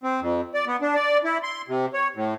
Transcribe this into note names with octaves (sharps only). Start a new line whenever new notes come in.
C4
F2
D5
B3
D4
D5
E4
C6
C3
C#5
A2